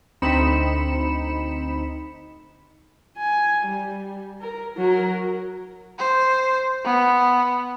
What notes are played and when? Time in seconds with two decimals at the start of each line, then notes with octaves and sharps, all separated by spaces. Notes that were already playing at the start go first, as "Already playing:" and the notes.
0.22 D2 C4 D#4 B5 C#7 E7
3.17 G#5
3.66 G3
4.41 A#4
4.77 F#3 A#4
5.98 C5
6.84 B3